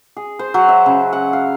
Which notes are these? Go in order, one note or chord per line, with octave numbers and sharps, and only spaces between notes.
G#4
C5
F#3
E5
C#3
F#5
F5